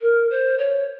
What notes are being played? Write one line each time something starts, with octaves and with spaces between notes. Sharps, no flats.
A#4
C5
C#5